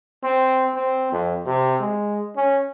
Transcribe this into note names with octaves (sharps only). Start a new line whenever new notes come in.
C4
C4
F2
C3
G#3
C#4